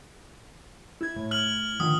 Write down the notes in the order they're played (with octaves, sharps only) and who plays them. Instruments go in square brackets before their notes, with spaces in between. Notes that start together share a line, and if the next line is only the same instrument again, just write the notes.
[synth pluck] E4 G#6
A2
[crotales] F6 F#7
[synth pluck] D3 D#3 F3 [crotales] D#6